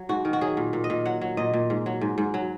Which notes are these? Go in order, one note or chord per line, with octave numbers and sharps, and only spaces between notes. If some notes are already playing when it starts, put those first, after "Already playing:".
Already playing: F#3
G#2 F#4
D#3
F#4
F#3 G#4
A#2
A#2
D#5
A#2
F#3 F#5
F#3
A#2 D#5
A#2
G#2
F#3
G#2
G#2
F#3